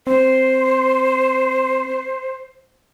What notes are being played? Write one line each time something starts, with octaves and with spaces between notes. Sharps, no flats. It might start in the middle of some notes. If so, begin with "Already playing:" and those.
C4 C5